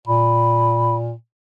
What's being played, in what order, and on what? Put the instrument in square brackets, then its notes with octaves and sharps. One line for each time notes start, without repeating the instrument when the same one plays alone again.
[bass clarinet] A#2 [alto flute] B5